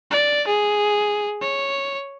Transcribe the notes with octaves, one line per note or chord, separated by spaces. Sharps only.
D5
G#4
C#5